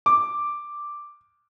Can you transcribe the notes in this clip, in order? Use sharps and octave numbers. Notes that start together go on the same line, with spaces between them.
D6